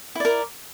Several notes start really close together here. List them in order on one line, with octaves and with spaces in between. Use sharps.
E4 D5 A#4